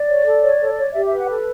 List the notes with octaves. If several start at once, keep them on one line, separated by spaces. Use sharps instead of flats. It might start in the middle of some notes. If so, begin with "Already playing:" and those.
Already playing: D5
C#5
A4
C#5
A4
C#5
G4 E5
E5
B4
F#5
A4